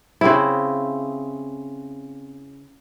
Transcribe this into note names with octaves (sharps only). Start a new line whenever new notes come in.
C#3 C4 E4